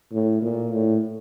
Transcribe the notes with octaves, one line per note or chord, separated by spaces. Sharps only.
A2
A#2
A2